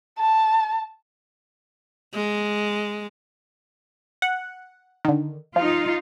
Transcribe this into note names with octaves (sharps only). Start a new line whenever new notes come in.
A5
G#3
F#5
D3 D#3
F3 D#4 F4